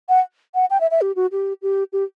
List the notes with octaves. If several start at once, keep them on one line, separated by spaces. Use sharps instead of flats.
F#5
F#5
G5
E5
E5
G4
F#4
G4
G4
G4